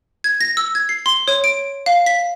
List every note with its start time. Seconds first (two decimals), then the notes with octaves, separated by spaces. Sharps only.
0.24 G#6
0.41 A#6
0.57 E6
0.75 G#6
0.89 C7
1.06 C6
1.28 C#5
1.44 D7
1.86 F5
2.06 B6